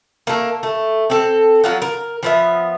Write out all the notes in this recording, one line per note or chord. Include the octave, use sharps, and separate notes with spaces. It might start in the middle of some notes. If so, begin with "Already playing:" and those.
A3 A#3
A3
C4 A4
F#3 F4 F#5
A#4
F3 B3 E5